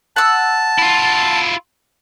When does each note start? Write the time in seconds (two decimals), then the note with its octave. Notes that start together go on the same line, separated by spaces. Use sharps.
0.16 F#5 A5 E6
0.78 E4 F4